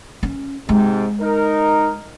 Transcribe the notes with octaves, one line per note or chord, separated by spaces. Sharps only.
C#4
G#2 C3 G#3
D#4 A#4